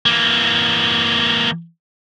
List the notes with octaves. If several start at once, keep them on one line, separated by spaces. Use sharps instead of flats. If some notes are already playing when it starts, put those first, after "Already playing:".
E3 A#3